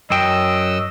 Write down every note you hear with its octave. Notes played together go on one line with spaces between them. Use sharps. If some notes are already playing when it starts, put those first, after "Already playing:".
F#2 F#3 D#5 G5 E6